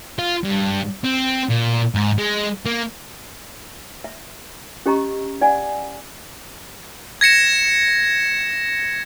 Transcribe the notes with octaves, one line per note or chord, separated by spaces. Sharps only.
F4
G2
C4
A#2
G#2
G#3
A#3
E5
C#4 G4 D#5 A#5 C#6
D5 F#5 G#5
G#6 A#6 C#7 E7